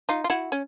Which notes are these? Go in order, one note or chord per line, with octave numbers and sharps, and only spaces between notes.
D#4 F4
F4
E4 F#4
C#4